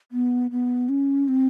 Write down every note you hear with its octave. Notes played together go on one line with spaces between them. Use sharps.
B3
B3
C#4
C4